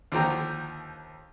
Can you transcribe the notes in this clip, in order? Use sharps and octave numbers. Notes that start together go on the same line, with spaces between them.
D#2 D3 F3 G5 A#5